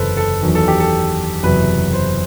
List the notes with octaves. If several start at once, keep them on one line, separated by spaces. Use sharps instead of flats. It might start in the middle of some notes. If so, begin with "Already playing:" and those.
Already playing: F#1 E2 C3 A4 B4 C5
A4
E2 D#3 F#3
A4
G4
A4
F#1 E2 C3 F#3 B4
C5